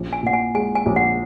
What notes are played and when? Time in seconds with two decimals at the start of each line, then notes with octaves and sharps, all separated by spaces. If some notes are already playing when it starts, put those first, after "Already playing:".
Already playing: A#1 C#4
0.13 G#5
0.23 A#2 F#5
0.33 G#5
0.54 G#3 G#5
0.75 G#5
0.86 A#1
0.96 F#5